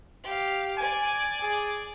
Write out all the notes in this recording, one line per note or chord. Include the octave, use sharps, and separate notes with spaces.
G4 F5
D5 G#5 D6
G#4